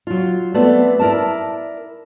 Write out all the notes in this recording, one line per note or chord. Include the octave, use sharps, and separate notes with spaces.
F#3 F4
A3 B3 C4 D5
E4 A#4 D5 A5